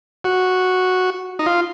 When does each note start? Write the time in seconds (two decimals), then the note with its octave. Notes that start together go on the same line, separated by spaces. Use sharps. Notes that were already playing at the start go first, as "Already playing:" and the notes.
0.24 F#4
1.39 D#4
1.46 F4